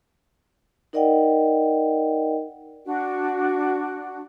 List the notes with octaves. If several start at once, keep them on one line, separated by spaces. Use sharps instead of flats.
D#4 A#4 D5 D#5 F#5 G5
D4 F#4